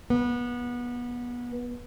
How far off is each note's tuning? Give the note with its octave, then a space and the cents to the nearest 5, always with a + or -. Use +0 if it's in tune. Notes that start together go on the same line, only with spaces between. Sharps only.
B3 -25